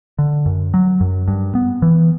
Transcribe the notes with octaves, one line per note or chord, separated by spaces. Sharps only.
D3
F#2
F#3
F#2
G2
B3
E3